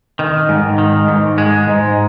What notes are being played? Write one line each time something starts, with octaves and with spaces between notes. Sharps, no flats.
D#3
G#2
D#3
G#2
G#3
G#2